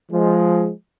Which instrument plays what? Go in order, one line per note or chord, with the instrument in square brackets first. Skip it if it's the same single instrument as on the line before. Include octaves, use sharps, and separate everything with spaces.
[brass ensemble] F3 G#3